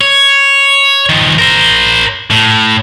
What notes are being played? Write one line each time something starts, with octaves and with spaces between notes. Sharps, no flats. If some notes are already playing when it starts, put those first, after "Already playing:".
C#5
D#3 F3
A#4 C5
A2